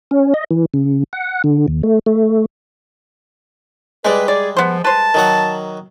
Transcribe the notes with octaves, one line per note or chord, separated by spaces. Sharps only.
C#4
D#5
E3
C#3
F#5
D3
D#2
A3
A3
G3 G#3 B4 D5 G5
G#4 D5
F3 B3 C5
B4 C5 A5
D#3 F#3 F#5